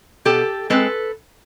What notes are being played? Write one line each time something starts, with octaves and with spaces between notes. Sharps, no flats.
B2 G4 A4
G#3 C4 A4 B4